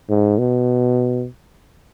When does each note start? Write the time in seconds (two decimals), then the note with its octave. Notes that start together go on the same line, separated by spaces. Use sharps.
0.10 G#2
0.39 B2